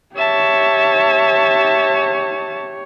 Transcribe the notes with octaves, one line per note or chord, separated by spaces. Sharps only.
G4 C#5 E5 A5